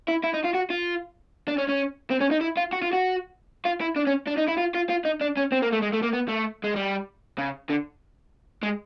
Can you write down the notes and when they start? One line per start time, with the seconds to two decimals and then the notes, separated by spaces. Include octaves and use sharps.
0.08 E4
0.24 E4
0.34 D#4
0.45 F4
0.55 F#4
0.70 F4
1.48 D4
1.58 C#4
1.69 C#4
2.11 C4
2.21 C#4
2.31 D#4
2.41 E4
2.57 F4
2.73 F#4
2.82 F4
2.93 F#4
3.65 F4
3.81 E4
3.96 D4
4.07 C#4
4.27 D4
4.38 D#4
4.48 E4
4.58 F4
4.75 F4
4.90 F4
5.05 D#4
5.21 D4
5.37 C#4
5.52 C4
5.62 A#3
5.73 A3
5.83 G#3
5.94 A3
6.03 A#3
6.14 B3
6.29 A3
6.64 G#3
6.76 G3
7.38 C#3
7.70 D3
8.63 G#3